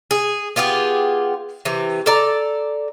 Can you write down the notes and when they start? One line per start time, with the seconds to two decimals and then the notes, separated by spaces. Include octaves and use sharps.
0.11 G#4
0.56 B3 F4 G4 G#4
1.65 C3 E3
2.06 A4 D5 A#5